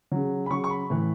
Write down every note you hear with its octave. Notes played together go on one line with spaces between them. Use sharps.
C#3 F#3
B5
C#3 F#3 C#6
C#6
B5
A2 E3